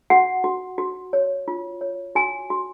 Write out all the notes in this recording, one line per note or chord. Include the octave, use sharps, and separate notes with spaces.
F#4 F#5
F#4
F#4
C#5
F4
C#5
F#4 G#5
F#4